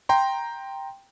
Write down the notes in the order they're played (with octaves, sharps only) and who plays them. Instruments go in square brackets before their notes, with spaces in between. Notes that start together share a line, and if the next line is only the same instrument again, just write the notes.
[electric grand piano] G5 A#5 C6